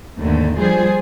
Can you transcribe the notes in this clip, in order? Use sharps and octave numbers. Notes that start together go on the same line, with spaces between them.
D#2 G#2 D3 A3
F3 G3 F4 G#4 C5